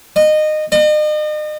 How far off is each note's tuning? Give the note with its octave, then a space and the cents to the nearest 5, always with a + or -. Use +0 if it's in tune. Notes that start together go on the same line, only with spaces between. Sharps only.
D#5 -20
D#5 -40